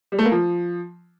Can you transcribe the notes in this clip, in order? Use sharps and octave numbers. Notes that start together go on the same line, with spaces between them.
G3
A3
A#3
F3